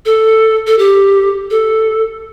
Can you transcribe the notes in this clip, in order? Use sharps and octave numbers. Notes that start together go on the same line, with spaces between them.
A4
A4
G4
A4